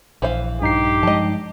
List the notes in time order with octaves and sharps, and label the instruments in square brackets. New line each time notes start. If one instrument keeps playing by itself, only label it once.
[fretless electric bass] A#1 [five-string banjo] E3 C5 F5
[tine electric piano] G2 D#4 C7 [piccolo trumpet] G4
[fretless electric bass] F3 G#3 [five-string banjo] D#5 A5